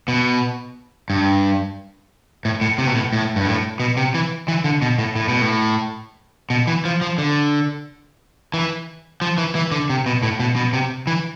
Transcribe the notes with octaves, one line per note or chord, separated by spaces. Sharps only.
B2
G2
A2
A2
C3
B2
A2
A2
G2
A2
B2
C3
E3
E3
D3
B2
A2
A2
B2
A2
B2
E3
F3
F3
D3
E3
F3
E3
E3
D3
C3
B2
A2
B2
B2
C3
E3